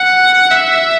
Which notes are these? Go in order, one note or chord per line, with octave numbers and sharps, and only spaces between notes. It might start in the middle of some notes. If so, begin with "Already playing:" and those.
Already playing: F#5
E5